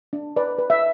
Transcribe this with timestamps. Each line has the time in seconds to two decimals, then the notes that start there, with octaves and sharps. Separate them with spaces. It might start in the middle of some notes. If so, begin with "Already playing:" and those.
0.13 D4
0.36 B4 D5
0.58 B4
0.70 E5